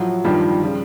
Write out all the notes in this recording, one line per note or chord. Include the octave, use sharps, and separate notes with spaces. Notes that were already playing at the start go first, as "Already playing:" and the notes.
Already playing: A2 F3 F#3
G2 D#3 F3 G3
C#3 F3